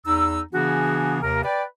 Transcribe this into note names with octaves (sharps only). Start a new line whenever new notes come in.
E2 D#4 E6
C#3 E3 B3 D4 F#4 G#4
D#2 C3 A#4
B4 D5 G5